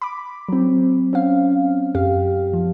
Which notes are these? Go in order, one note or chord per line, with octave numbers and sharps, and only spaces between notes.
B5 D6
F#3 C4
C4 C#4 F5
F#2 G4 F5
F3